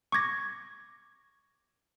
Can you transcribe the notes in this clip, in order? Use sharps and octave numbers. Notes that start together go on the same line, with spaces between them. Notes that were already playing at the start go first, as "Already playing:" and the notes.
C#6 D6 G#6 A#6